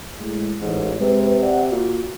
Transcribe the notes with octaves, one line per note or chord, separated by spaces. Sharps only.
A2 G#3
A1 G#2
C3 G#3 B4
D5 F#5
A#2 F#4